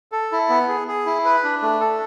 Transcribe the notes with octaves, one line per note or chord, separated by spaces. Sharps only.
A4
E4
B3
G#4
G#4
E4
B4
D4
A3
A4